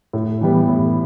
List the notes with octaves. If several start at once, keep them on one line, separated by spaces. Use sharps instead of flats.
A2
E3 G3 B3
A2